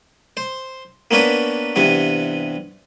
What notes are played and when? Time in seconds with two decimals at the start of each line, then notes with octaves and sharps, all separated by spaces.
0.37 C5
1.11 A#3 B3 C#4 D4 B4
1.76 G2 C3 E3 B3